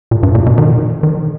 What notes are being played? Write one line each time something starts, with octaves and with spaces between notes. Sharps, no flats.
A#2
G2
A#2
B2
D#3
D#3